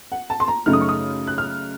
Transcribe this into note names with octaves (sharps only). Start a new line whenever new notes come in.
F#5
A5
C6
A#5
F#2 C#3 A3 D#4 F6
D#6
C#6
D#6
F#6
F6